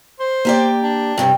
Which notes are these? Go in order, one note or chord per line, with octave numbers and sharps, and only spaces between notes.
C5
A#3 G4 D5
D4
G2 C3 G3